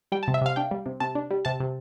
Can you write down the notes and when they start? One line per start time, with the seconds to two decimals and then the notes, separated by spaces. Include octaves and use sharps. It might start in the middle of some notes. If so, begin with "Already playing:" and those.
0.12 G3 G5
0.23 A5
0.28 C3
0.34 E5
0.41 C3 F5
0.56 D4 G5
0.71 G3
0.86 C3
1.00 C3 A5
1.15 D4
1.31 G3
1.45 C3 A5
1.60 C3